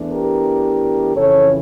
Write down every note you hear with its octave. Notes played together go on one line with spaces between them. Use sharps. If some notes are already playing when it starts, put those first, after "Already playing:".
Already playing: E2 E3 A3 D4
G4 A#4
F2 C#3 E3 A4 C#5